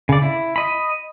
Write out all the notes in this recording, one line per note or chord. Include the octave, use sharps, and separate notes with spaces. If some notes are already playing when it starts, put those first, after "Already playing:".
C#3 D5
E4
D#5 B5